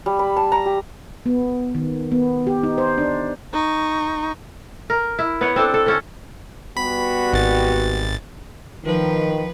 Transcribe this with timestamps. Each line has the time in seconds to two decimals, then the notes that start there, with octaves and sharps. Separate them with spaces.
0.06 G3
0.19 B5
0.36 A5
0.52 A#5
0.65 G4
1.26 B3
1.75 D#3
2.12 B3
2.47 G4
2.63 D#4
2.78 C5
2.98 D4
3.53 D#4 C#6
4.90 A#4
5.19 E4
5.41 B3 B4 C#5 F#5
5.56 C4 D4 A4
5.74 A4
5.86 D3 C#4 A4
6.77 G3 B3 F#4 B5
7.33 G#1 A6
8.84 D#3 F3 B4